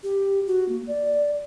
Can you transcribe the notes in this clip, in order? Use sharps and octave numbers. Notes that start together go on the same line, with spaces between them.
G4
F#4
A#3
D5